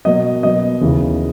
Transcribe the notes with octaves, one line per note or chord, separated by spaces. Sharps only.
B2 F#3 A#3 D#5
B2 F#3 B3 D#5
D#2 C#3 E3